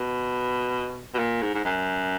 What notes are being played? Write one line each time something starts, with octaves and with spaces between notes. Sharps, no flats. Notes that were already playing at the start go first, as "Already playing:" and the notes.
Already playing: B2
B2
A#2
G#2
G#2
F#2